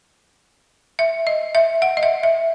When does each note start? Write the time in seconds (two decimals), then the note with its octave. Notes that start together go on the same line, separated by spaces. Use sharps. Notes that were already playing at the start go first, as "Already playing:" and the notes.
0.99 E5
1.27 D#5
1.55 E5
1.82 F#5
1.97 D#5
2.03 E5
2.23 E5